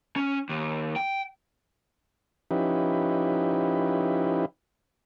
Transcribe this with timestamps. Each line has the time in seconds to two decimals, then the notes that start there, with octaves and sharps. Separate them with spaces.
0.16 C#4
0.49 D#2
0.96 G5
2.51 F3 C#4 D#4 E4 G4 B4